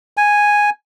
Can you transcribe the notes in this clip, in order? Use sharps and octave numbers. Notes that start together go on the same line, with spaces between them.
G#5